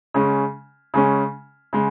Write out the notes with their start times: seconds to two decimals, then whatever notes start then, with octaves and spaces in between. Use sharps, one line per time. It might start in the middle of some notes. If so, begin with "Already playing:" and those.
0.14 C#3 G#3 C#4
0.94 C#3 G#3 C#4
1.73 C#3 G#3